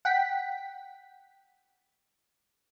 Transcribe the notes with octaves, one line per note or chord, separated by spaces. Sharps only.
F#5 G5 B6